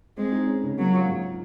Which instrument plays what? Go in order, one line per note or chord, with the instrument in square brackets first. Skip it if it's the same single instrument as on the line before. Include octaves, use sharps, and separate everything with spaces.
[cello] G#3 [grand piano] C4
[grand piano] D#4
C#4
C#3
[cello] F#3 [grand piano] A#3
[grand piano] F4
G#2